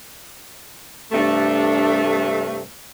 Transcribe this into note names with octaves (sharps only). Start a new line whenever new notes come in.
G2 C3 A3 D4 A4